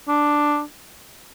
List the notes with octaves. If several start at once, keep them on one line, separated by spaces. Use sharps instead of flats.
D4